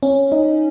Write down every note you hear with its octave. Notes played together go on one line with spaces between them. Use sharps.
C#4
D#4